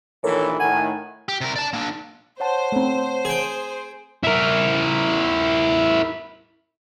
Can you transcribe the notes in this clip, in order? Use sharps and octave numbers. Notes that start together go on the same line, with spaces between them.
A#1 D#3 E3 A4 A#4 C#5
A2 D#3 F#5 G#5
G4
C3 A#4
D5 A5
A#3 D4
C5 C#5 F#5 A5
A3 C4
G#4 G5
E4 A#4